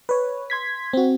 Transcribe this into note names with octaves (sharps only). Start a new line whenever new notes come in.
B4 C#5
C6 G#6 B6
C4 F#4